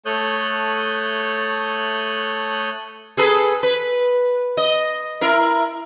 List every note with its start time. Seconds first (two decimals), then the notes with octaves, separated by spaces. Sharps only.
0.06 A3 A4 C#5 D#6 F#6 G6
3.17 G#4 A4 B4
3.63 B4
4.57 D#5
5.21 E4 A#4